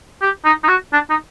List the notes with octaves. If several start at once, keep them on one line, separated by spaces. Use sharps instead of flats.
G4
D#4
D#4
F#4
D4
D#4